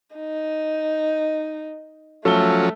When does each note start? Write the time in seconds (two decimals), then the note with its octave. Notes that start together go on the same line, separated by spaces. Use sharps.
0.15 D#4
2.25 F3 F#3 A3 C#4 A4 G7